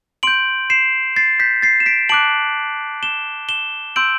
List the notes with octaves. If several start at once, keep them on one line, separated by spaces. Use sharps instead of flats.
C6 G6 D7 F#7
C7 E7
A6 C7
G6 B6
A6 C7
E7
B6 D7
A5 D6 F#6 D7 F#7
E7 G7
E7 G7
C6 E6 G6 D7 F#7